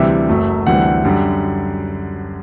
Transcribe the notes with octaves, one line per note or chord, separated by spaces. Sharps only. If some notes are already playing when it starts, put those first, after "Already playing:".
Already playing: D2 C3 E3 G3 E5
F#1 F#2 F#3 A3
D2 C3 E3 G3 F#5
F#2 D3 G3